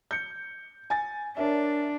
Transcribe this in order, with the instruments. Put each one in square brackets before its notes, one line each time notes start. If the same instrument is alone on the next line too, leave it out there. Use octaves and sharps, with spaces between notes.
[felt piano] G6 C#7
G#5 A6
[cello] D4 [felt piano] A#4 C#5 E5